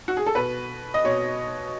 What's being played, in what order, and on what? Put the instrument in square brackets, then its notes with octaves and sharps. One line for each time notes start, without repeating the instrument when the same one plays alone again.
[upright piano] F#4
G#4
A4
B2 B4
D#5
B2 C#5